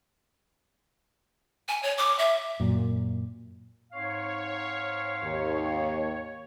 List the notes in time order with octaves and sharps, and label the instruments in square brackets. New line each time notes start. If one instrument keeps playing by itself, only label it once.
[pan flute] G#5
C#5
D6
E5
[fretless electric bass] F#2 A#2
[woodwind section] G#2 C4 F5 [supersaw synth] C#5
[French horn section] D#2